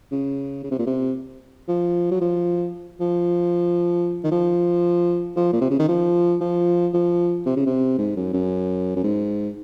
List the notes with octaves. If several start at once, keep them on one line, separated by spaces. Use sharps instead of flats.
C#3
C#3
C3
A#2
C3
F3
F#3
F3
F3
D#3
F3
F3
A#2
C3
C#3
D#3
F3
F3
F3
C3
C#3
C3
G#2
F#2
F#2
F#2
G#2